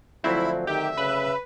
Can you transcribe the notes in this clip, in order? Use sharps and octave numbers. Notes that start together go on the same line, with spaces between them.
D2 F3 F#3 C4 E4 B5
D#3 G4 E5
C#3 B4